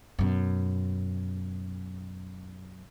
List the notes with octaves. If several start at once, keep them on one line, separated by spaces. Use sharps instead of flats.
F#2 B2